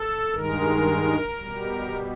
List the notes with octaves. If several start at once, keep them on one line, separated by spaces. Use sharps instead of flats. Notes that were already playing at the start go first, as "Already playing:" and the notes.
Already playing: A4
G2 D#3 G#3 A#4
B2 G3